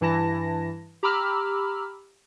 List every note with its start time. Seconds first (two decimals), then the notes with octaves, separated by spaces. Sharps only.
0.01 G2 E3 E4 A5 A#6
1.03 G4 A#5 B5 D6 E6 F6